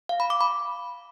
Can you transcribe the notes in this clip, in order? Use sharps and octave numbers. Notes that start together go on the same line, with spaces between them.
F5
B5
D6
B5